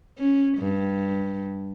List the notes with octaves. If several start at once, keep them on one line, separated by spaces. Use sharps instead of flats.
C#4
G2